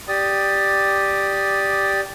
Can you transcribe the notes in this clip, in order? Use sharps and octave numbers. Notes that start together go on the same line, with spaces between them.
G4 D5 D#6